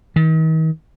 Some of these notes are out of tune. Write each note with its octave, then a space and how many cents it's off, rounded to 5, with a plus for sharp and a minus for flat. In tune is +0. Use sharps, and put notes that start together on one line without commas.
D#3 +40